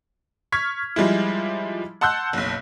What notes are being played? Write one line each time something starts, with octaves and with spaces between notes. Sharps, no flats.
C#6 F6 G#6 B6
F3 G3 G#3 E4
F#5 A5 C6 E6 F#6 G6
F#1 B1